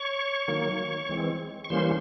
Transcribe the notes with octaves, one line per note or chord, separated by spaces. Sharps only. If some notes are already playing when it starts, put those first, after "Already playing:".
Already playing: C#5 C#6
D#3 F#3 A#3
E3 G#3 C4
C#6
E3 G3 A#3 C#4 C5 C6